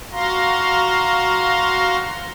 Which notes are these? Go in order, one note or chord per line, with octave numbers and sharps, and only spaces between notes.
F#4 F5 A#5 C6